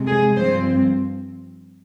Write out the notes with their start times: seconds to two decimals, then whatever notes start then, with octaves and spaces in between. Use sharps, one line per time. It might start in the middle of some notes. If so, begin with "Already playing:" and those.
Already playing: C3 G#3
0.08 G#4
0.36 G2 F3 C4 C5